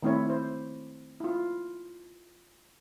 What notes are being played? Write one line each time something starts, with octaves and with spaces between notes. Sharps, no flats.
D#3 A3 C4 E4 C#5
E4 C5
E4 F4